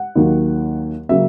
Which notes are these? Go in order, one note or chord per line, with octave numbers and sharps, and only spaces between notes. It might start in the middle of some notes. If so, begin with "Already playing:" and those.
Already playing: F#5
D#2 D#3 F#3 A#3
C#3 F#3 A#3 E5